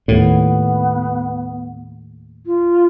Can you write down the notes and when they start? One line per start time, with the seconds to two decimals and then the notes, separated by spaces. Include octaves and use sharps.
0.08 D#2 A2 B3
2.45 F4